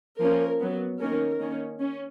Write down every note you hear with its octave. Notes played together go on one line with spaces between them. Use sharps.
F3 A#3 C#4 A#4
F#3 B3
D#3 A#3 C#4 A#4
D#3 A#3 C#4
C#4